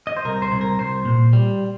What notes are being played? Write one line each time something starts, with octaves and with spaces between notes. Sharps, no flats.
D#5
C5
C2 A#4
C5
C2
A#4
C2 C5
A#2
G3